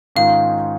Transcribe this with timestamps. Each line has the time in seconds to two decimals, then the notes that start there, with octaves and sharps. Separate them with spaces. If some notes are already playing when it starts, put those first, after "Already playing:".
0.16 G#2 D#3 C#4 F4 F5